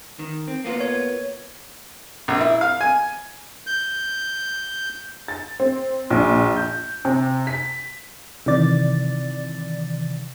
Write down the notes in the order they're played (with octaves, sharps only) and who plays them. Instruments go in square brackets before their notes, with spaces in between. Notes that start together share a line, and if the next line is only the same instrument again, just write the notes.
[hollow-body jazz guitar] D#3
C4
A#3 B3 F4
[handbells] C#5
[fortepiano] A#1
E4
F5
G#5
[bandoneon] G6
[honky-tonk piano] A6
C4
A#1
G6
C3
B6
[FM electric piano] C3 D#3 E3 D5 A6